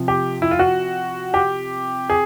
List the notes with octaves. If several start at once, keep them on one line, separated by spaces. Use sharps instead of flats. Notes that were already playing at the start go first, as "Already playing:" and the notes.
Already playing: C3 F3
G4
E4
F4
F#4
G4
G#4